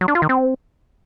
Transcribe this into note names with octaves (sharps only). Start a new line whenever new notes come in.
F#3
D4
F4
D#3
C4